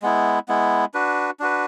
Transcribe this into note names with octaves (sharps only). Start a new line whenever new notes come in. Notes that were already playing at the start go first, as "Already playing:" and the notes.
G#3 B3 E4
G#3 B3 E4
D4 F#4 B4
D4 F#4 B4